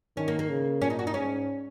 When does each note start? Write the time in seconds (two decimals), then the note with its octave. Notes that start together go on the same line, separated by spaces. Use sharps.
0.17 D#3 C#4
0.28 A#3
0.39 A#3
0.50 C#3
0.81 A#2 C#4
0.90 D#4
0.99 F#4
1.07 D#4
1.14 G#2 C#4